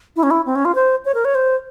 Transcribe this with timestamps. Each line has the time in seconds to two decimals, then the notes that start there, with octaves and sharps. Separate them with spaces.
0.16 E4
0.23 C#4
0.31 E4
0.46 C4
0.55 C#4
0.65 F4
0.75 C5
1.05 C#5
1.14 A#4
1.25 C#5
1.35 C5